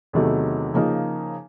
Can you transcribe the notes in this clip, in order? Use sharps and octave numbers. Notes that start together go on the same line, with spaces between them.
E2 C3 D#3 F#3 A3
C#3 F3 A#3 D#4